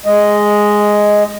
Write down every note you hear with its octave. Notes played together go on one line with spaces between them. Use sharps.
G#3 D#5